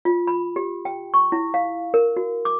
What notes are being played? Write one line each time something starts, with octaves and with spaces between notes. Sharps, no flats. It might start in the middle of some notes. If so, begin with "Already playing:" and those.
F4
B5
G4
G5
C#6
E4
F5
A#4
F#4
D6